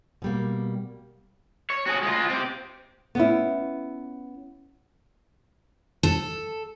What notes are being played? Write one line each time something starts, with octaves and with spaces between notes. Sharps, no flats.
B2 G3 A#3
C#5
F#4 G#4
G#3 F4
C4 G4
B3 C#4 E4
A4